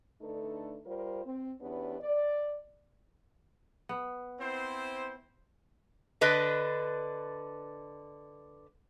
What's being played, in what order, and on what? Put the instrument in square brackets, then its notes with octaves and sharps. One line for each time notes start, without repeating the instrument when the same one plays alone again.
[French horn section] D3 A3 D4 D#4 A4 B4
G3 F4 A#4 C5
C4
E2 B3 C#4 D4 G4 B4
D5
[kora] B3
[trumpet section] C4 E4 C5
[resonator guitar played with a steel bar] D3 D4 B4 D#5